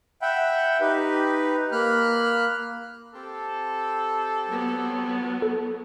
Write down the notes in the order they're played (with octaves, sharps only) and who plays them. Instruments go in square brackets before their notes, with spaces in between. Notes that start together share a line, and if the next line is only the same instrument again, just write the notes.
[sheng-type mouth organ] E5 F#5 G5 B5
D#4 G4 B4
A#3 B5 F6 F#6
[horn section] C4 G4 A4
[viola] F#3 B3
[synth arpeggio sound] A4